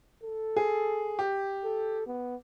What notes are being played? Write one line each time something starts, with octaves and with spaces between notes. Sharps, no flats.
A4
G#4
G4
A4
B3